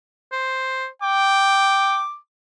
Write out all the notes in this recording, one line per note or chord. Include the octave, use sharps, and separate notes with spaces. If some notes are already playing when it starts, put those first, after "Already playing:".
C5
G5 D6